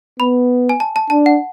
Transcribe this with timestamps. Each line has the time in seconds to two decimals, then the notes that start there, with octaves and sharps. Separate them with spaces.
0.20 B3 B5
0.69 G#5
0.80 A5
0.96 A5
1.10 D4 A5
1.26 F#5